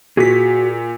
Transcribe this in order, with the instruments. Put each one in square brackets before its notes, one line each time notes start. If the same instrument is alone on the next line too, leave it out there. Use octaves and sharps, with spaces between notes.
[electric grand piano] A#2 B6 [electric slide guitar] F#4 G#4